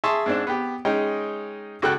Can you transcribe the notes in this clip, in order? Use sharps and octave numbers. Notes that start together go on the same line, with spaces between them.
G#4 E5 A5 C6 C#6
G#2 C4 D4
B3 G4
G#3 C#4 D#4 D#5 G5
C#2 F#4 A4 G5 F#6